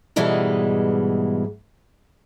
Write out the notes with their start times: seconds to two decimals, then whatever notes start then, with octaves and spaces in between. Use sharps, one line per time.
0.16 G#2 B2 E3 G3 G#3 A4